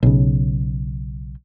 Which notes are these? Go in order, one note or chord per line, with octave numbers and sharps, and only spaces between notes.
B1 C#3